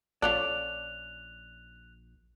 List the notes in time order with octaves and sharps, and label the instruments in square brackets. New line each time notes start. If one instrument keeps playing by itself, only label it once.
[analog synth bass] A#1 [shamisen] C#4 F4 A4 [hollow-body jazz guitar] D5 [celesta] F#6 F7